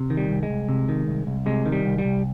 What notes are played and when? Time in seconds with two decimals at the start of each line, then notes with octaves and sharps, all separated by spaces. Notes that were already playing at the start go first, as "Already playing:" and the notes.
Already playing: C3
0.10 D#3
0.17 G3
0.30 C2
0.43 G#3
0.50 C2
0.69 C3
0.89 D#3
1.08 C2
1.27 C2
1.46 C3 G#3
1.66 D#3
1.72 G3
1.86 C2
1.98 G3
2.05 C2